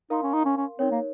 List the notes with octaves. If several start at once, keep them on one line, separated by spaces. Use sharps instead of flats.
D#4 A#4 F5 C6
C#4
D#4
C#4
C#4
C4 D#4 A#4 C#5
A#3